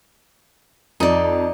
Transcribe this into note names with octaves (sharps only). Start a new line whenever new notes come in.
F2 D#4 D5